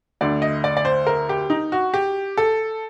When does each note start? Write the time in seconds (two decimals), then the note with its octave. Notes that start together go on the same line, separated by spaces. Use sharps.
0.21 D2 D3 D5
0.42 D#5
0.64 D5
0.77 D5
0.85 C5
1.07 A#4
1.29 G4
1.50 D#4
1.72 F#4
1.94 G4
2.37 A4